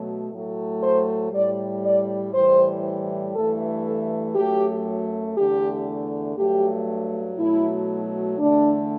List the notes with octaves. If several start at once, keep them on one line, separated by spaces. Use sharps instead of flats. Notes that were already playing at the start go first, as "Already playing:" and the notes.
Already playing: B2 F#3 A3
A2 F#3 A3
C5
A2 G3 D5
D5
A2 E3 G3 C5
G2 E3 A3 A4
A4
F#2 F#3 A3 G4
E2 D3 A3 G4
G2 F#3 A3 G4
B2 F#3 A3 E4
E2 D3 A3 D4